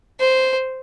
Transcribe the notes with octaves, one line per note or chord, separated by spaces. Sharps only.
C5